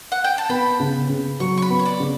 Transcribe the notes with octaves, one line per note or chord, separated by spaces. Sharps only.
F#5
G5
A5
B3 B5
C#3
C#3
F#3 C#6
C#6
B5
B3
C#5
D5
C#3